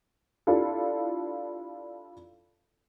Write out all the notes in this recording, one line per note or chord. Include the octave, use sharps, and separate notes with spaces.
D4 E4 F4 G4 A4